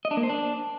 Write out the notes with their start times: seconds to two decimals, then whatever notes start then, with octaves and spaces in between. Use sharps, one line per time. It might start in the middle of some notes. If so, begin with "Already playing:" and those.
0.05 D#5
0.11 D4
0.17 A#3
0.23 C5
0.29 D4